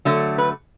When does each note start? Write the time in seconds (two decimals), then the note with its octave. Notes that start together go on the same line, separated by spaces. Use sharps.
0.05 D3 F#3 A3
0.38 B4